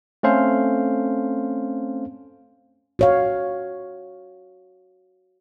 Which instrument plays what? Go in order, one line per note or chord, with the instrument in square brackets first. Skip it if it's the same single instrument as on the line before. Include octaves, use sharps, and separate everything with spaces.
[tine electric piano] A3 C4 C#4 A4 C5 F5
[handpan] F#4 C#5 F5